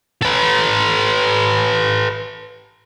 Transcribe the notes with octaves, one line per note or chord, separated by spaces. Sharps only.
A4 B4